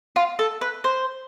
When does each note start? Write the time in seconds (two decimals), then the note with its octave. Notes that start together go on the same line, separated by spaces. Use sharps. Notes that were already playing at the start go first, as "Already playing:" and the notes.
0.16 F4
0.39 A4
0.61 B4
0.84 C5